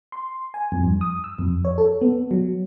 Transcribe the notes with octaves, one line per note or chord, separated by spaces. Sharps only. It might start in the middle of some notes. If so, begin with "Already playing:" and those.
C6
G#5
F2
G2
D#6
E6
F2
C#5
A4
B3
F#3